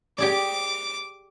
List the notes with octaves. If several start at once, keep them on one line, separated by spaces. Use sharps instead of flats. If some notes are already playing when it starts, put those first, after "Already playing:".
G4 G#4 D5 D6